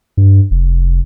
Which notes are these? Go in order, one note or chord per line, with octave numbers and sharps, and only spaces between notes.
G2
F1